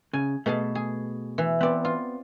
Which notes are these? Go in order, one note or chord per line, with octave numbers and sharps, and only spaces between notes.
C#3 G#5
B2 A3 G#4 A5
G#4
E3
B3 C4 D5
F4